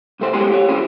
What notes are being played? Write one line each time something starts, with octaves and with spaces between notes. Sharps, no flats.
C2 A3 C5
B1 G#3 A3 C#4 G4 C6
G4 C#5
C#4 E4 F#4 G#4 C5